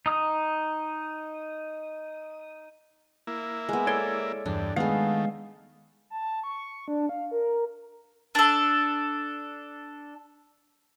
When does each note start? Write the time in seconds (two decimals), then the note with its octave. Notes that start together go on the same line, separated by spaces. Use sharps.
0.06 D#4 D#6
3.27 A#3 E4
3.69 G#3 B3
3.87 A4 C#5 D5 C6
4.46 E2 G2 D4
4.76 D#3 G#3 A3 B3 G#4 F5
6.10 A5
6.44 C#6
6.88 D4
7.09 F5
7.31 A#4
8.35 D4 A4